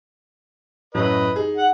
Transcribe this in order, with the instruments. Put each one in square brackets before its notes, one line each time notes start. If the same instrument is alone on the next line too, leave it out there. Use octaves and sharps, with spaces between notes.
[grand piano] F#2 A2 F#3 [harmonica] B4 D#5
[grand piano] D#4 G#4
[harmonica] F#5